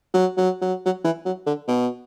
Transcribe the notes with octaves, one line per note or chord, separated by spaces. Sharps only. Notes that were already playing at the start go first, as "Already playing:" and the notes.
F#3
F#3
F#3
F#3
E3
F#3
D3
B2